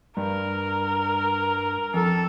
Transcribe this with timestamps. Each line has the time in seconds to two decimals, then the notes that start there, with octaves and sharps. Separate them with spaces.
0.17 G2 A#4
1.94 F2 A4